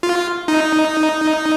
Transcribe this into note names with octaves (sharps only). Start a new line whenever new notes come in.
F4
D#4